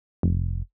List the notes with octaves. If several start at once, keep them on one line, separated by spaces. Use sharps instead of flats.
F1